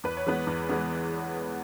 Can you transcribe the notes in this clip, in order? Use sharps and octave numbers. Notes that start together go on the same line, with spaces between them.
E2 B4
C#5
E3 G#3 B3 B4
E2
E3 G#3 B3